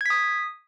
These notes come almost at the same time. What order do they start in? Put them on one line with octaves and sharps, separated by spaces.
G#6 B6 D#6